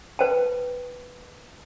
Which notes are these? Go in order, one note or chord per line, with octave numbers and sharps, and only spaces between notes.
B4 C5 G5 A5